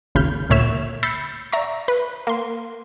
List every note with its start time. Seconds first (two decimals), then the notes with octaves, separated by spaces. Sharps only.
0.15 G#1 D#2 C#3 B5 F6 G6
0.50 D2 A#2 C#5 E5 E7
1.03 B5 E6 G6 A6 C7 C#7
1.52 D5 E5 A#5 C#6
1.88 B4
2.27 A#3 C6